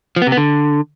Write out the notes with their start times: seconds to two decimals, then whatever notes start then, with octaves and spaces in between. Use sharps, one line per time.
0.16 F3
0.22 B3
0.27 C3
0.32 B3
0.37 D3